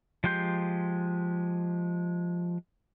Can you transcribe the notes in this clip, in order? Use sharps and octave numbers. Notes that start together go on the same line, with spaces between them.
F3 G#3 G4 C6 G6